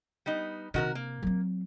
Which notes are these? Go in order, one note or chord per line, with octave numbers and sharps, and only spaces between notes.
G3 B3 D#4
C3 D#3 F#4 A#4
A#3
F#3 C4